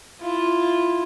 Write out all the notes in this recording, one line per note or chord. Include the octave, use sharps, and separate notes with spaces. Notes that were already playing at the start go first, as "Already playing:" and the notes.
E4 F4